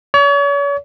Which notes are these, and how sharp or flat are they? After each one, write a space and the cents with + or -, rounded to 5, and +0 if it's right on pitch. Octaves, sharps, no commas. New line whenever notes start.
C#5 +40